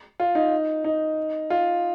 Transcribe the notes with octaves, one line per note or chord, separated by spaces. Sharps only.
F4
D#4
D#4
F4